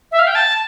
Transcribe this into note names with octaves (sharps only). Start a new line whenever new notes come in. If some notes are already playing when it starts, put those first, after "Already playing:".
E5
F5
G5
A5